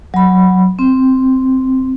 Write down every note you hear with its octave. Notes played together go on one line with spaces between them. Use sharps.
F#3 B5
C4